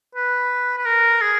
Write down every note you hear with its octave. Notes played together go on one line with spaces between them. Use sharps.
B4
B4
A#4
G#4